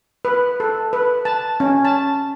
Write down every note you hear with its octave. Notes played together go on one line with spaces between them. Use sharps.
B4
A4
B4
A5
C#4
A5